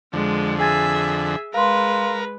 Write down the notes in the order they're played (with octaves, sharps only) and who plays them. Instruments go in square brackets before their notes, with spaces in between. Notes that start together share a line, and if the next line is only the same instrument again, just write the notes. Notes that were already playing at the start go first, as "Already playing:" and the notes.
[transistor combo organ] F2 D3 [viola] G#3
[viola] G#4 E5 [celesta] G#5 G#6 A6
[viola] G#3 B4 [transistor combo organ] A#4 [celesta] F5 C6